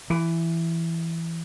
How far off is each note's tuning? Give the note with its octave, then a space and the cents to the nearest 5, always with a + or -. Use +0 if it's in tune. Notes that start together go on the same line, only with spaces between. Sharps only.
E3 +10